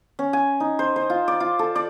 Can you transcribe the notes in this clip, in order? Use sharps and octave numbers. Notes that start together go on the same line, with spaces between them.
C#4
G#5
D#4
C5
C5
F4
D5
F4
A4
D5